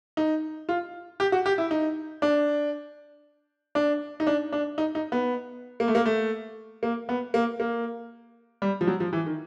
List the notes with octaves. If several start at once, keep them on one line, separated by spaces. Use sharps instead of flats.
D#4
F4
G4
F#4
G4
E4
D#4
D4
D4
D#4
D4
D4
D#4
D#4
B3
A#3
A3
A#3
A3
A#3
B3
A#3
A#3
G3
F3
F#3
F3
E3
D#3